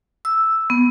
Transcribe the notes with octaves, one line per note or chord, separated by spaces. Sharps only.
E6
B3